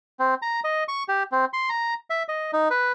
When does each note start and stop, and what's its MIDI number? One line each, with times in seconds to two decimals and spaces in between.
0.20 0.35 60
0.42 0.60 82
0.64 0.84 75
0.88 1.03 85
1.08 1.23 67
1.32 1.45 60
1.53 1.69 84
1.69 1.94 82
2.10 2.23 76
2.28 2.51 75
2.53 2.69 63
2.70 2.92 71